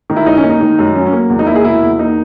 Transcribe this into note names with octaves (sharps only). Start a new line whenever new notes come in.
D#3
E4
F#2 D#4
C#4
A#3
D#4
D#3
F#2
F#3 C#4
C#4
A#3
E2
D#4
A#3 E4
G#4
B2 E4
E2
A#3 D#4